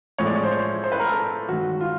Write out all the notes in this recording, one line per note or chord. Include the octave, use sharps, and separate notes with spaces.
A2 F3 G#3 C#5
D5
C#5
C5
C#5
C5
B4
A#4
A4
G2 D#3 G#3 F#4
F4